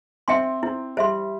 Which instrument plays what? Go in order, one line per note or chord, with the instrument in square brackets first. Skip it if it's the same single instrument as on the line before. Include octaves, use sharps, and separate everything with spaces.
[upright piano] C4 [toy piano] E5 G5 C6
[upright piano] C4 [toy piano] E4
[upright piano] G3 [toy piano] C5 E5 C6